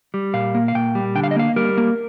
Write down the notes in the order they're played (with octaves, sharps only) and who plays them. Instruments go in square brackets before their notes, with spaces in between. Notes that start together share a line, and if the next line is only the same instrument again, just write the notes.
[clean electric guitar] G3
A#2 F5
A#3
F5
A#2 G5
G3
D3 G5
F5
D#5
A#3 F5
G3 A#4
A#3